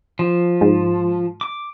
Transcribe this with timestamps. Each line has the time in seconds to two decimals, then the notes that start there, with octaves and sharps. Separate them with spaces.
0.19 F3
0.61 G#2
1.41 D6